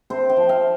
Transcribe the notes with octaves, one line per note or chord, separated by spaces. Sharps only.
C4 C5
G5
F3
F5